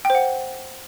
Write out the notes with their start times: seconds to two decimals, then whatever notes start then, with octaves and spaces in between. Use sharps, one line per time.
0.05 G5
0.10 C5
0.15 F#5